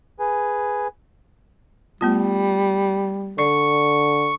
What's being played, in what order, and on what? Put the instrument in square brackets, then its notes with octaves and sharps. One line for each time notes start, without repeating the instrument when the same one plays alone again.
[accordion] G#4 B4 G#5
[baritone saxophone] G3 [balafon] A3 B3 F4
[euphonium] D3 [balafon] D5 [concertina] C#6